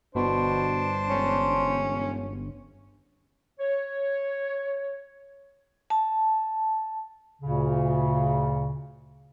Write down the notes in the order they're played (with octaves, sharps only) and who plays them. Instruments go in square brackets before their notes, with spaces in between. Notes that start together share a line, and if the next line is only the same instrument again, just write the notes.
[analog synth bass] G1 [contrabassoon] B2 [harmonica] D4 C5
[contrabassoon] E1 [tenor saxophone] C#4
[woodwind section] C#5
[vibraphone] A5
[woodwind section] D2 A#2 C#3